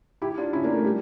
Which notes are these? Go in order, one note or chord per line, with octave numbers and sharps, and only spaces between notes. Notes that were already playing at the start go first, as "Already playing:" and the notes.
E4 G4
D4 F4
C#4 E4
A#3 D4
A3
G3